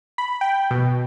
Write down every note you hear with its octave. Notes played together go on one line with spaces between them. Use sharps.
B5
G5
B2